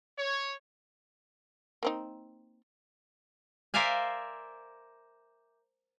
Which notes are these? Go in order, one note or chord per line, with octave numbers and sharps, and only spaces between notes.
C#5
A#3 C4 D#4
A#4 C5 D5 E5 F5 G#5